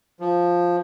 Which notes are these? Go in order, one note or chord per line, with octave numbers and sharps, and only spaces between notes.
F3